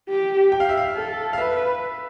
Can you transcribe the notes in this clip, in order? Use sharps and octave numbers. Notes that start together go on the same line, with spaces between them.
G4
G5
F5
E5
F5
A4
F5
B4 E5